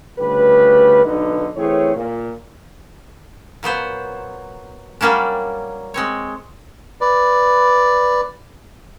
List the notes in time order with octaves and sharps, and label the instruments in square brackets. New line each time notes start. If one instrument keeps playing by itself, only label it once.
[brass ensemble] D2 C#3 G3 B4
B1 D3 D4 D#4 B4 D#5
E3 A3 C4 G#4 C#5
A#2
[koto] A#2 F#3 B3 C5
F#3 G3 A#3 C#4 D4
G#3 C4 C#5
[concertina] B4 D5